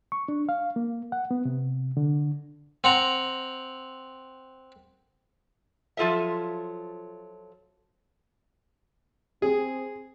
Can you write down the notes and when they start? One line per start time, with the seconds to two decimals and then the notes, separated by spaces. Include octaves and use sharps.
0.12 C#6
0.28 D4
0.49 F5
0.76 A#3
1.12 F#5
1.31 B3
1.45 C3
1.97 D3
2.84 C4 F#5 A#5
5.97 F3 F#3 F4 A4 D#5 E5
9.42 C4 G#4